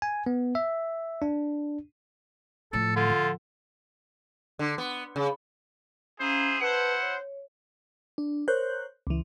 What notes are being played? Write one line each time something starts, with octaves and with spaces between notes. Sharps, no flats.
G#5
B3
E5
D4
A2 F3 A4
D3 F4
F3
D3
B3
C#3
C#4 E4 G#4 C5 F5 A#5
E4 B4 C5 F#5 A5
C#5
D4
A#4 C5 C#5 F#6 G6
C#2 E3